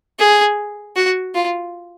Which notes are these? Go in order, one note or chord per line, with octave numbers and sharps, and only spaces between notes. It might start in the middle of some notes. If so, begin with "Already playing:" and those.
G#4
F#4
F4